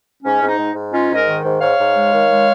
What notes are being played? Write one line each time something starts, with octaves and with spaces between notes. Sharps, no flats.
G#2 C#4
G#2
D#4
G#2
G#2
G#3 C#4 F4
G#2 A#4 D#5
D#3
G#2
G#2 C#5 F5
G#2
G#3
D#3
G#3